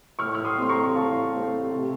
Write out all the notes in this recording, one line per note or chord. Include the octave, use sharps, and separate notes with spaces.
A2 C#6 F6
F6
C6 D#6
A3 C4 C6
A#5 C#6
A2 F5 A5
A3 C4
C3